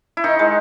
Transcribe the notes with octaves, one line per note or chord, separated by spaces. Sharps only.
E4
D#3 D#4
G#3